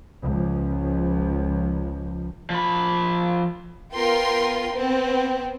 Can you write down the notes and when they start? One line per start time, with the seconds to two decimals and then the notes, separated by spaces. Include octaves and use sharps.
0.21 C#2 F3
2.50 F3 B5
3.94 B3 F4 A#4 G5 C6
4.72 B3 C4